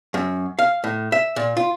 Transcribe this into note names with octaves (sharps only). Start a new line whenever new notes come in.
F#2
F5
A2
E5
A#2
F4